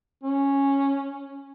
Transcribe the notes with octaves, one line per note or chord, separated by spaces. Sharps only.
C#4